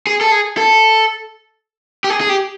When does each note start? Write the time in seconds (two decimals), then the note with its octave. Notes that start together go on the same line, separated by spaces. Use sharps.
0.07 G#4
0.21 A4
0.32 G#4
0.57 A4
2.04 G4
2.10 G#4
2.21 G#4
2.29 G4